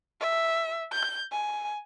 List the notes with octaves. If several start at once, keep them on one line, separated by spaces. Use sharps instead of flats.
E5
G6
G#5